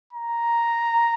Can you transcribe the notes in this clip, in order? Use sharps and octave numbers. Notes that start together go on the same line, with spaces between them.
A#5